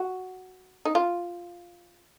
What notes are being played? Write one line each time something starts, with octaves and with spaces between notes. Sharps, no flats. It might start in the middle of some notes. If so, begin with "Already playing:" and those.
Already playing: F#4
D#4
F4